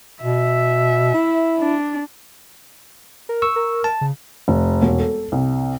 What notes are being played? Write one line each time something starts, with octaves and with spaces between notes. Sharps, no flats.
B2 E5
E4
D4
A#4
C#6 E6
A#4
A5
C#3
F1
E1
A4
C2